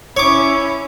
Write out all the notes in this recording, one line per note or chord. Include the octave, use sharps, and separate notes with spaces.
C#4 E4 C#5 D6